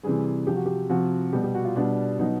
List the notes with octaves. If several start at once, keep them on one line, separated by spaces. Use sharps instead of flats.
C3 E3 G3 G#4
C3 F3 G4
F#4
G4
C3 F3 F#4
B2 G3 G4
G4
F#4
F4
B2 G3 D4
B2 F#3 D#4